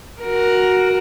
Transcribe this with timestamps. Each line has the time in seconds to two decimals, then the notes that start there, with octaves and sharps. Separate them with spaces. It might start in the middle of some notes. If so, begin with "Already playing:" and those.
0.22 F#4 A#4